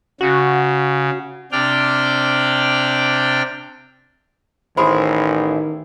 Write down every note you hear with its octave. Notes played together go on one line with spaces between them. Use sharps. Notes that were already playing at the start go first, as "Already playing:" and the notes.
C#3 F#4
C3 D4 D5 G5 F6
A1 D#3 E4 G#4 C5 B5 C6